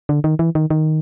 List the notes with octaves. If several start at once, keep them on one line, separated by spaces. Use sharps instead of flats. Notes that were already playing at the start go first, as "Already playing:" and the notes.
D3
D#3
E3
D#3
D#3